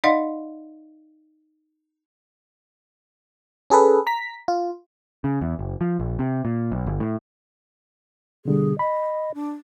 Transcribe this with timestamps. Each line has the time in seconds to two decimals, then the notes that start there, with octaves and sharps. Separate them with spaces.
0.04 D#4 D5 D#5 F5 F#5 C6
3.70 C#4 G#4 A4 B4
4.07 A#5 B6
4.48 F4
5.24 C#3
5.41 E2
5.59 F#1
5.81 F3
6.00 A#1
6.19 C3
6.45 A#2
6.72 B1
6.87 G1
7.00 A2
8.45 B2 D3 G3 G#4
8.79 D#5 B5
9.34 D4